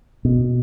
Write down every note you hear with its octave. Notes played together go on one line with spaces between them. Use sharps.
B2